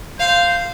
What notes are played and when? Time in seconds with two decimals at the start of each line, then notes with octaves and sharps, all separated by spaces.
0.19 C5 F5